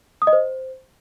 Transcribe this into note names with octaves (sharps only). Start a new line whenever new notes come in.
D#6
D#5
C5